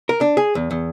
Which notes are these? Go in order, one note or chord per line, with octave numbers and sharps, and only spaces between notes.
A#4
D4
G#4
E2
E2